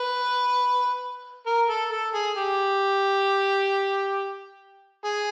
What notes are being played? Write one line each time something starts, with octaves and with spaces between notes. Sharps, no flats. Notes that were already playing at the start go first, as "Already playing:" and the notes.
Already playing: B4
A#4
A4
A4
G#4
G4
G#4